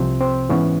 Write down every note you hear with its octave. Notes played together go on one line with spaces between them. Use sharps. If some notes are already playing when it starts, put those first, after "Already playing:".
Already playing: C2 C3 F3 C4
C4
G#2 E3 B3 C#4